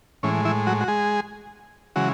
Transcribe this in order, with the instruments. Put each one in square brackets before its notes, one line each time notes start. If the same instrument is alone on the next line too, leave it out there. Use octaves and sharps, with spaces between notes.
[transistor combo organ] A2 E3 G#3 C#4
E3 E4
F#3 F#4
F#4
G#3 G#4
C#3 E3 F#3 G#3 F#4